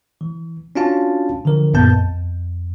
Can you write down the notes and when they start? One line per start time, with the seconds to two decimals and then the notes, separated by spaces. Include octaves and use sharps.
0.21 E3
0.75 C#4 D4 F4 F#4 F5 A5
1.45 D3 E3 F3 A#4
1.73 A#1 F#2 A#2 B3 A5 G6
1.92 F2